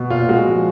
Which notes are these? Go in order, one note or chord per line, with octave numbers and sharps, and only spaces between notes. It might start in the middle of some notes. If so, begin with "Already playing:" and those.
Already playing: B2
A#2 F4
G#3 F#4
F3